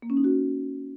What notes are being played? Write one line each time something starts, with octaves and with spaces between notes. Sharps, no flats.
A#3
C#4
D#4
F#4